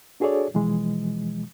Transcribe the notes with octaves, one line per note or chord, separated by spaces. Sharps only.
D4 F#4 G#4 A4 C#5 D5
B2 E3 F3 G#3